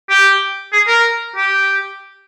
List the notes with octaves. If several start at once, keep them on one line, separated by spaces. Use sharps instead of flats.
G4
G#4
A#4
G4